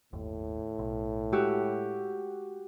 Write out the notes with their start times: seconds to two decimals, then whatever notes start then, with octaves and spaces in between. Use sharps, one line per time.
0.13 G1 D#2 A2
0.79 B1
1.32 G#3 F#4 G4 E6